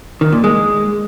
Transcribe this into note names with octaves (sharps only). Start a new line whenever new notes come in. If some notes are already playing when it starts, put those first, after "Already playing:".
D#3
A#2
G#3